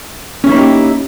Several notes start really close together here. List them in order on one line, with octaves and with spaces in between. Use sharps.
C#4 E4 D#4 A#3 G4